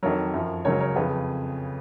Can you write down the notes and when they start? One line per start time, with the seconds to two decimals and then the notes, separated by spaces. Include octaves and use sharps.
0.03 F2 D#3 F#3 A#4 C#5
0.34 F#2 F3
0.65 C#2 C#3 F#3 A#4 C#5
0.80 A#4 C#5
0.96 F2 C#3 F3 G#4 B4